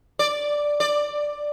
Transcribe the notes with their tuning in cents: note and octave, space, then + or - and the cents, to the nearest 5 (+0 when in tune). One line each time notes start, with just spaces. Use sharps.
D5 +0
D5 +10